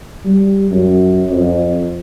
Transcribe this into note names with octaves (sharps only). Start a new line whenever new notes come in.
G3
F#2
F2